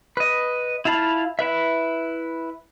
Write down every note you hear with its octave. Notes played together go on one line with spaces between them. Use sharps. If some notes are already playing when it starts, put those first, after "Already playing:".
B4 D#5
E4 F4 F5 A5 B5
E4 B4 E5